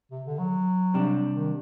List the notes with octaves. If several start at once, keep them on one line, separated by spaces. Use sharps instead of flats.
C3
D3
F#3
C3 G3 D4
D#3